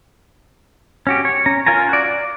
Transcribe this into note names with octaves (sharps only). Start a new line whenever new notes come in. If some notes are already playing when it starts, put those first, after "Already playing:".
C#4 F#4 G4
C#5
C#4 A#5
F4 A#4 G#5 A#5
F#4 D5
D5